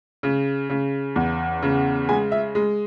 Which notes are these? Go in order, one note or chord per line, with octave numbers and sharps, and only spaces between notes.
C#3
C#3
E2
C#3
G#3 G#5
E5
G#3